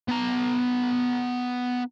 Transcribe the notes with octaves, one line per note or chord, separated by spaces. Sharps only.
B3 A#5